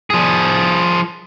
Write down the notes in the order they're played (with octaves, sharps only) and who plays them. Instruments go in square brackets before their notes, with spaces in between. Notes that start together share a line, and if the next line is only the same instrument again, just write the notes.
[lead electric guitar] F3 G#4